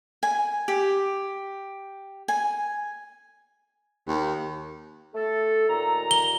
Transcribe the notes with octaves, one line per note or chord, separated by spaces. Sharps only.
G#5
G4
G#5
D#2
A3 A4
D#2 A#2 A#5
G7